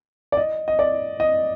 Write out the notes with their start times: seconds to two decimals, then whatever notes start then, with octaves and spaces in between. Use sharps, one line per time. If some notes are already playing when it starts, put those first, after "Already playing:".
0.32 D5
0.37 D#5
0.68 D#5
0.79 D5
1.20 D#5